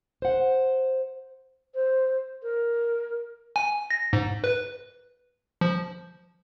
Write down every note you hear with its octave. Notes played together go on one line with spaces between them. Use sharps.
C5 F#5
C5
A#4
G#5
A#6
G#2
B4
F3